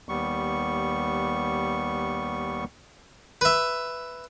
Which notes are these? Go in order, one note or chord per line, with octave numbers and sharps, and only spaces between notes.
D#2 G3 B3 C#6
B4 E5